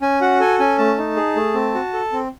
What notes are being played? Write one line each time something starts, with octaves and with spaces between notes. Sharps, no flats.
C#4 G#5
F#4 F#5
A4 G#5
C#4 G#5
A3 A5
D#4
G#4
A3
C4
F#4
A4
C4